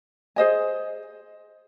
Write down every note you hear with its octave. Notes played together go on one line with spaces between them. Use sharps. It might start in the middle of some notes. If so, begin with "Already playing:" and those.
G#4 C5 D#5 G#5